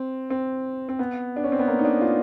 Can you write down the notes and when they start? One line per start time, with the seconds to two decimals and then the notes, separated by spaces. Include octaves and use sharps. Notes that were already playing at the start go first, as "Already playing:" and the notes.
Already playing: C4
0.30 C4
0.89 C4
0.99 B3
1.36 D4
1.44 C#4
1.52 C4
1.59 B3
1.67 A#3
1.79 D#4
1.85 D4
2.01 F4